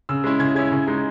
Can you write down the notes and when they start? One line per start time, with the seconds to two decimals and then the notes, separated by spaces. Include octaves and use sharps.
0.09 C#3 E6
0.24 G#3 C#4 E4
0.39 C#3 G#6
0.55 G#3 C#4 E4 G#6
0.72 C#3
0.87 G#3 D#4